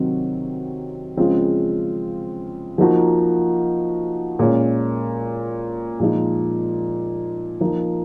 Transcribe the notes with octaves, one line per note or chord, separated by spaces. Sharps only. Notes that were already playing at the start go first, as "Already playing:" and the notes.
Already playing: C3 D#3 F#3 C4 F#4
C#3 F3 G#3 C4 F4
F3 A#3 D#4 F#4
A#2 G#3 C#4
A#2 F3 G#3 D#4
F3 A#3 D#4